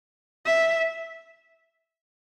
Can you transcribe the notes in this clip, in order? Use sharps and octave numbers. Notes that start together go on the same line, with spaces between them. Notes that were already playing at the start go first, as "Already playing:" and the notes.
E5